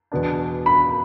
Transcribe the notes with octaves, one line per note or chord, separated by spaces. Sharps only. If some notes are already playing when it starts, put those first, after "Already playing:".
E2 B2 B3 D4
B5